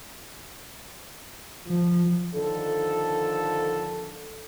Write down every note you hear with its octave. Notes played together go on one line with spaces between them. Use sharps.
F3
D3 D#3 F3 A4